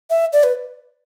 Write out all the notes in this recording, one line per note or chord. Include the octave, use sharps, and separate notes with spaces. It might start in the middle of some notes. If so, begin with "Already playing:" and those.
E5
D5
B4